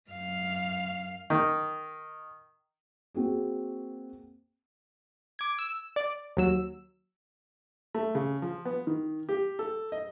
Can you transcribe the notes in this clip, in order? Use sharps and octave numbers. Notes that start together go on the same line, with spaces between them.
F#2 F5
D#3
A#3 C4 F#4 G#4
D6 G#6
E6
D5
D#2 F#3 E6
A3
C#3
F3
B3
D#3
G4
A4
D#5